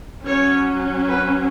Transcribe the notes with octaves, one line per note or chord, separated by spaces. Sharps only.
F#3 C#4 C#5
B4